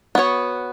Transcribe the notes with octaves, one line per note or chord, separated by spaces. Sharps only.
B3 F#4 C#5